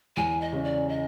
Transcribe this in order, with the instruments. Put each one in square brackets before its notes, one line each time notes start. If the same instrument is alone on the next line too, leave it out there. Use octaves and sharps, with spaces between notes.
[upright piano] E2 [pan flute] G#5
[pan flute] D#5
[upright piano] C#3
[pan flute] D5
D#5